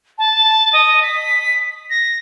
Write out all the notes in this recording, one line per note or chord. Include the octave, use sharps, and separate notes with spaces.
A5
D#5
B6
A#6